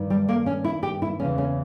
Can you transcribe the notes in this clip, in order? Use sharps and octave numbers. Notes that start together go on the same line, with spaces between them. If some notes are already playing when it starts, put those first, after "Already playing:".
Already playing: G2 D#3
G3
A#3
C#4
E4
G4
E4
E2 C#3 E3 C#4
C#4